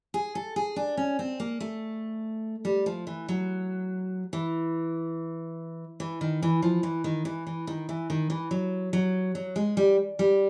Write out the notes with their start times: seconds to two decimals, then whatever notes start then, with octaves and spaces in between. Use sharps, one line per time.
0.14 G#4
0.35 A4
0.56 G#4
0.76 D4
0.97 C#4
1.19 C4
1.40 A#3
1.60 A3
2.65 G3
2.86 F3
3.07 E3
3.29 F#3
4.33 E3
6.00 E3
6.21 D#3
6.42 E3
6.62 F3
6.83 E3
7.04 D#3
7.25 E3
7.47 E3
7.67 D#3
7.89 E3
8.10 D#3
8.30 E3
8.51 F#3
8.93 F#3
9.35 F#3
9.56 G#3
9.77 G3
10.19 G3